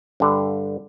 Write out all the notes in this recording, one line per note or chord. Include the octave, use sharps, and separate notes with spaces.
G2 D3